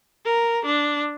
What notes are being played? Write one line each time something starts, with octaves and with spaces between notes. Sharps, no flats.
A#4
D4